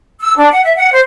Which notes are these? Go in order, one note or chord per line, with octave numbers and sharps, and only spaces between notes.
E6
D4
F#5
E5
F#5
C5